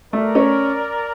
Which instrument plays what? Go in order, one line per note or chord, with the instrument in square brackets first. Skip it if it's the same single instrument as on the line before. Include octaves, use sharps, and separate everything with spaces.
[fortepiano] A3 [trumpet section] A#4 D5
[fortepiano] C#4